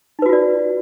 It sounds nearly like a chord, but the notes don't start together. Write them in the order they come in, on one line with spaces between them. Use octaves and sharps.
D#4 B4 F#4 F4 D5